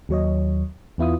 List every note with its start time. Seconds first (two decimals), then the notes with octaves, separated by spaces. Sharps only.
0.09 D#2 F#3 C#5 D#5
0.98 E2 B3 E4 F4 D#6